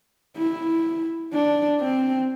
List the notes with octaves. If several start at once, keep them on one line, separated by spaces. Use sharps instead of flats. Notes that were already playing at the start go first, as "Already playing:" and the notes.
E4
D4
C4